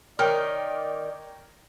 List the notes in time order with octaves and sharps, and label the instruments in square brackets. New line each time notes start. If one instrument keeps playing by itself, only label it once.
[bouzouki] D#3 [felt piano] A#4 C#5 G5 [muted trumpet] D5 [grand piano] F6